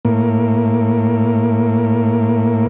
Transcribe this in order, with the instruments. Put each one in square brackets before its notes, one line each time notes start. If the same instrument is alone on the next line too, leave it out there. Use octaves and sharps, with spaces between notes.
[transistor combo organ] A2 A#3